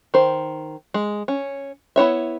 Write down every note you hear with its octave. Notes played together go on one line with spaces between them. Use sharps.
D#3 C5
G#3
C#4
B3 E4 C#5 E5